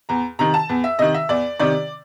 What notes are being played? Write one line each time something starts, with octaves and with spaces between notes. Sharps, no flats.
E2 A#5
C3 D#3 A#5
A5
E2
E5
C3 D#3 D#5
E5
E2 D5
C3 D#3 D5